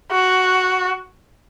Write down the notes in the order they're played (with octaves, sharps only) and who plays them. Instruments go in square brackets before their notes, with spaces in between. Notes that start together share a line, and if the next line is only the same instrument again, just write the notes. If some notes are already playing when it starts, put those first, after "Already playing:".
[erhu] F#4